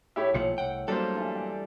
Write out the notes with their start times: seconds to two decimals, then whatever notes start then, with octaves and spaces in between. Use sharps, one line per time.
0.16 A2 E4 G4 C#5
0.34 B1 A#2 F3 C#7
0.58 C2 F#5 G5
0.88 F#3 G3 A#3 D4 A4 C5
1.15 G2 E3
1.35 G5